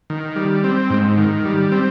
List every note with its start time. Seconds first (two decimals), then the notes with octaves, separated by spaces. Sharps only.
0.10 D#3
0.36 G3
0.64 C4
0.90 G#2
1.18 D#3
1.45 G3
1.72 C4